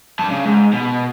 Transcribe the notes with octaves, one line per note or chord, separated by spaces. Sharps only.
G2 A5
C#3
G#2
B2